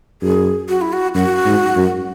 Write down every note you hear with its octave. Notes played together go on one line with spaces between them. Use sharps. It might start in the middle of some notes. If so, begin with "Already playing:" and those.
F#2 G#4
F#4
E4
F#4
F#2 F#4
G#2
F#2